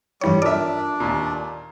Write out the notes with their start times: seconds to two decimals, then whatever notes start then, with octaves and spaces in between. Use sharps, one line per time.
0.21 G2 E3 G3 C#5
0.42 D4 D#4 F4 A4 A#4 D5 E5
1.00 D#2 A#2